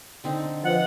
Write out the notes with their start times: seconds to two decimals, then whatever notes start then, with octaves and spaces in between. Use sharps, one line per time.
0.24 D3 C4 D#4
0.64 F3 B4 D#5 F#5